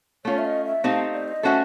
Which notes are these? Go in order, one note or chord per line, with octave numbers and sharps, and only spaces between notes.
A3 C#4 F4 C#5
E5
D#5
E5
A3 C4 D#4 G4 C5 F5
D5
D#5
A3 C#4 F#4 A4 C5 E5